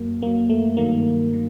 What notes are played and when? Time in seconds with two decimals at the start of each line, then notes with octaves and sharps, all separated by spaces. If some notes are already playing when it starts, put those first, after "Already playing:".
Already playing: F#2 F#3 A#3
0.22 F#2 A#3
0.27 F#3
0.50 A3
0.77 G2 D#3 F#3 A#3
1.34 D#3